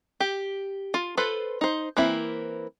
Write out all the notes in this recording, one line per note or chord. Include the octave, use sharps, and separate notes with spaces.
G4
F4
F4 A4 B4 C5
D#4 C5
E3 A#3 C4 E4